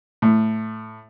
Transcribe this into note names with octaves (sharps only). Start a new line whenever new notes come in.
A2